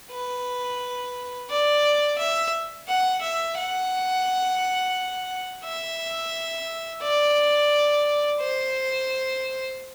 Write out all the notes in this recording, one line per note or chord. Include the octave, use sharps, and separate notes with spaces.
B4
D5
E5
F#5
E5
F#5
E5
D5
C5